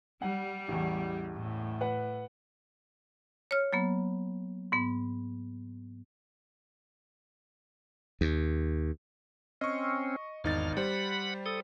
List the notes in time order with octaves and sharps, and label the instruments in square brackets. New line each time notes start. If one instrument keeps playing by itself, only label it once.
[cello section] G3 [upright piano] F#5
[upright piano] A1 E2
[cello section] A2
[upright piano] B4 F#5
[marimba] C#5 F6
F#3 A#3 B3
G#2 B3
[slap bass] D#2
[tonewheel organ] C4 C#4 [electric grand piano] D#5 C#6
[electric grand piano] G#1 D#4 A6 [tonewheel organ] E2 F6
[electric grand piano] G3 C5 [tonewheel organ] F#5 B5
[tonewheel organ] A4 D#6